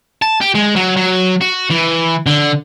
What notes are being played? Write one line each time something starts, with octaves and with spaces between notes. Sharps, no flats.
A5
G4
G#3
F#3
F#3
F#4
E3
D3